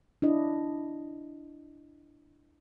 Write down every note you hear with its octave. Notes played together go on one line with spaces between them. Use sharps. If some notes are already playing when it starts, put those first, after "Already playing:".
D4 E4 D#5